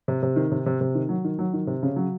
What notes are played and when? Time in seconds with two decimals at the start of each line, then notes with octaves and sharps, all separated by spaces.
0.08 C3
0.23 C3
0.36 D#3
0.51 C3
0.66 C3
0.81 C3
0.95 D#3
1.09 F#3
1.25 D#3
1.39 F#3
1.53 D#3
1.67 C3
1.83 C#3
1.96 F#3